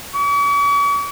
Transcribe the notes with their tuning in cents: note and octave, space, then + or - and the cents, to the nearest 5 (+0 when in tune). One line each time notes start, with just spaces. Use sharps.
C#6 +45